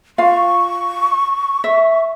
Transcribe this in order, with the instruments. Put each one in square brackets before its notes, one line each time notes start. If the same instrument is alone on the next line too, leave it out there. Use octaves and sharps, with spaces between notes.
[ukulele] F4 F5 [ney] C#6
[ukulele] E5